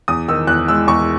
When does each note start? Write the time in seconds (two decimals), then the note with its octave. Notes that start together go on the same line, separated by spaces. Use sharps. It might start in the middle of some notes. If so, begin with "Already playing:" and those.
0.08 E2 D#6
0.28 D#3 E6
0.47 E2 F#6
0.68 G#3 E6
0.88 E2 C#6